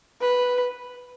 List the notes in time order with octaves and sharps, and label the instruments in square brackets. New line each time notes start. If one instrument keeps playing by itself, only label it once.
[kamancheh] B4